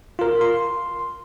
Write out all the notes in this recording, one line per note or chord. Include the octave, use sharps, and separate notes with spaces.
F4 A#4
C6